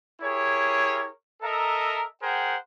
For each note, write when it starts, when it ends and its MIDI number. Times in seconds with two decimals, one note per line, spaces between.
0.21 1.09 64
0.21 1.09 67
0.21 1.09 68
0.21 1.09 70
0.21 1.09 73
1.42 2.06 69
1.42 2.06 70
1.42 2.06 75
1.42 2.06 76
1.42 2.06 82
2.22 2.56 68
2.22 2.56 70
2.22 2.56 72
2.22 2.56 78
2.22 2.56 79